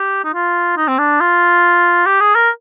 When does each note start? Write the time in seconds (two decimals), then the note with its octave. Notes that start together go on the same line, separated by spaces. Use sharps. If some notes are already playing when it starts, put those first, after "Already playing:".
Already playing: G4
0.24 D#4
0.34 F4
0.77 D#4
0.88 C4
0.99 D4
1.21 F4
2.06 G4
2.20 G#4
2.35 A#4